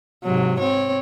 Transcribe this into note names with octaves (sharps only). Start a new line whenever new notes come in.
G#2 C3 F#3
C4 C#5